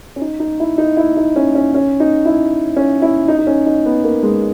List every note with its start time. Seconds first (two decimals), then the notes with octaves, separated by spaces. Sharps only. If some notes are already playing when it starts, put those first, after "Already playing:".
0.16 C#4
0.21 D#4
0.40 D#4
0.60 E4
0.78 D#4
0.97 E4
1.17 D#4
1.36 C#4
1.55 C#4
1.74 C#4
2.00 D#4
2.26 E4
2.77 C#4
3.02 E4
3.28 D#4
3.38 D#4
3.47 C#4
3.66 D#4
3.86 B3
4.04 A#3
4.23 G#3